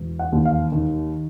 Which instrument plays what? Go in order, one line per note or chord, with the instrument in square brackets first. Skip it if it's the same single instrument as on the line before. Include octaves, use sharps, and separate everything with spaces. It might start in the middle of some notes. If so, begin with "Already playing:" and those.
Already playing: [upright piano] E1
F#5
D#2
F5
D#3